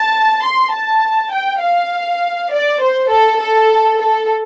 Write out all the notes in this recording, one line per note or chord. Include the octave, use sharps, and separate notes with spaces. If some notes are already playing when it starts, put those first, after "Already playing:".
Already playing: A5
C6
A5
G5
F5
D5
C5
A4
A4
A4